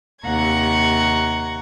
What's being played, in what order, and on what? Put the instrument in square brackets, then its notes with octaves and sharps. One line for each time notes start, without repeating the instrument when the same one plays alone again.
[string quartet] D#2 C3 F#5 A#5 C#6 G#6